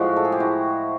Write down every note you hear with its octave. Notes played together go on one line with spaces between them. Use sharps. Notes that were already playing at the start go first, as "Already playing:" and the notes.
Already playing: A2 F3 G#3 F#4
A4
G#4
G4
E4 F#4